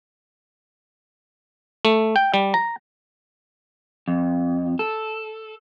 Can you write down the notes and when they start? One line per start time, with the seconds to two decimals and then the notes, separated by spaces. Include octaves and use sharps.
1.85 A3
2.16 G5
2.34 G3
2.54 A#5
4.08 F2
4.79 A4